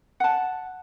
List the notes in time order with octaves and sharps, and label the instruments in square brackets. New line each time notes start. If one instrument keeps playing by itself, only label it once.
[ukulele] F#5 A5